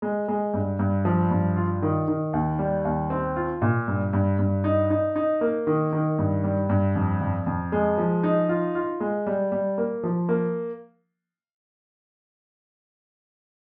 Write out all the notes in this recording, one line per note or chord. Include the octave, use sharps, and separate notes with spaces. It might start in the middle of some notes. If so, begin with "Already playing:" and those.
G#3
G#3
G2
G2
F3
G2
F4
D#3
D#3
D#2
G3
D#2
C4
F4
A#2
G2
G2
G2
D#4
D#4
D#4
A#3
D#3
D#3
G2
G3
G2
F2
F2
F2
G#3
F3
D#4
F4
F4
G#3
G3
G3
A#3
F3
A#3